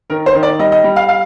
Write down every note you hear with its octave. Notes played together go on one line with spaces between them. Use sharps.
D#3 A#4
C5
D#3
D5
G3 D#5
D#5
G3
F5
F5